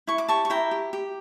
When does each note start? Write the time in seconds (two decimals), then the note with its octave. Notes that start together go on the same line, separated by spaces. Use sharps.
0.07 E4 C#6
0.18 D6
0.28 G4 A5 C#6
0.45 C#6
0.50 E4 G5 A#5
0.71 G4
0.93 G4